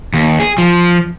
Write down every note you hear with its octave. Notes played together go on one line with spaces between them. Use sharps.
D#2
G#4
F3